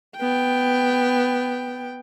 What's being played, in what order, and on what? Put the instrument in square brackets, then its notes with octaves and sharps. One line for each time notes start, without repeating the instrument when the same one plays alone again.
[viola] B3 G5